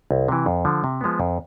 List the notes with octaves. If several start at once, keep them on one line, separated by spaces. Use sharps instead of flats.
C2
C3 E3
F2
D3 F3
C3
F3 G#3 B3
F2